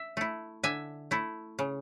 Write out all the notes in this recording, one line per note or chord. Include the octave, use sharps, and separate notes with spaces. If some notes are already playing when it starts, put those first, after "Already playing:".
Already playing: E5
A3 E4
D3 E5 G#5
A3 E4
C#3